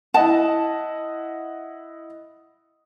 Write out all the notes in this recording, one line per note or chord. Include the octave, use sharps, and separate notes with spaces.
E4 D#5 F#5 A5